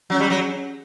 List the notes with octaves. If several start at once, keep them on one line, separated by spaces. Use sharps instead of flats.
F#3 C#4
G3
F#3